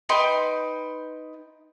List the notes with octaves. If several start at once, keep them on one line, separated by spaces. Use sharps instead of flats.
D#4 B4 G5 C6